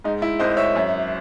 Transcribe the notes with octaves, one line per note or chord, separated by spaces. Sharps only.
G#2 D#4
E4
G#1 C5 D#5
C#5 E5
F#2